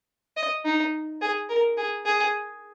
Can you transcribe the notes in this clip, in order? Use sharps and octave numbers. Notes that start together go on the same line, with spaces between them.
D#5
D#4
G#4
A#4
G#4
G#4